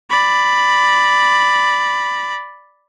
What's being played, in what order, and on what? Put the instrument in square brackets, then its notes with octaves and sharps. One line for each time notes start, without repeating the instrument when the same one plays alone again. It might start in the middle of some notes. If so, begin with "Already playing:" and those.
[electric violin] D5 B5